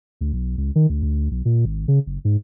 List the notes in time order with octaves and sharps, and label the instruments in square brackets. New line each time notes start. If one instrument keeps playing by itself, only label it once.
[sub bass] D2
B1
C#2
D#3
D2
D2
B1
A#2
G#1
C#3
F#1
G#2